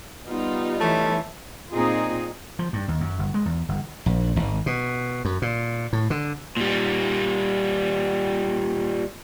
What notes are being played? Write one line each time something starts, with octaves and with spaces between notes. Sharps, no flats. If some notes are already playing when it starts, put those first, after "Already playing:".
G3 B3 D#4 F4
E3 A3 C#5
A#2 C4 D#4 F4 G#4
F3
G2
D#2
F#2
G1
G#3
E2
G1
A#1
G#1
B2
F#2
A#2
A2
D3
A#2 G3